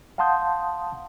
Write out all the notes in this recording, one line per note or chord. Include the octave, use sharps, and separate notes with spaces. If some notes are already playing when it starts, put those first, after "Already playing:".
F5 F#5 A5 C6 D#6 G6